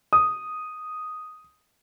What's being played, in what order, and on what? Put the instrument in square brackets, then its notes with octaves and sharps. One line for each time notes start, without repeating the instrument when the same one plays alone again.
[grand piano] D#6